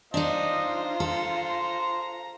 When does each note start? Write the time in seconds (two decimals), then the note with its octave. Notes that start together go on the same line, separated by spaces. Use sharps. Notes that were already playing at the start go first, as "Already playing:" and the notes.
0.14 D4 D#4 F4 C5 D#5 A#5
1.00 A4 C6